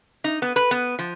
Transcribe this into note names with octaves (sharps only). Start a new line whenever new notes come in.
D#4
B3
B4
B3
F3